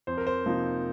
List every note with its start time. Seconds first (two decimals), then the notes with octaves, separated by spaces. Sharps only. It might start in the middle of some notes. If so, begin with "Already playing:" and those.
0.07 F2 C5
0.18 A#4
0.27 C5
0.46 C3 F3 A#3 D#4